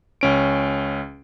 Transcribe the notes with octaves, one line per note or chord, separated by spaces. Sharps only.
C#2 C#4 D7